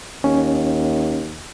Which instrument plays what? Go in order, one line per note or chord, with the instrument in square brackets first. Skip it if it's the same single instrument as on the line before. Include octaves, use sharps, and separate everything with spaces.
[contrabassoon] D#2 [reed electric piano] C#4